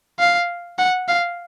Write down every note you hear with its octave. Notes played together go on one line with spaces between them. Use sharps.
F5
F#5
F5